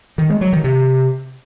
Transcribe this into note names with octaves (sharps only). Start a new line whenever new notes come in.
D#3
G#3
F#3
D#3
C3